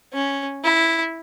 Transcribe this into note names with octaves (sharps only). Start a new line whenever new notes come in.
C#4
E4